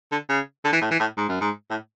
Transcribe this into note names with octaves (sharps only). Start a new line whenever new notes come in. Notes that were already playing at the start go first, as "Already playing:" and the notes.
D3
C#3
D3
E3
A2
E3
A2
G#2
F#2
G#2
A2